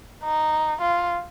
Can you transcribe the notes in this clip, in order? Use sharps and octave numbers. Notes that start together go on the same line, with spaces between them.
D#4
F4